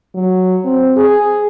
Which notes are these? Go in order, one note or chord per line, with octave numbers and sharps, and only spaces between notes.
F#3
C4
G#4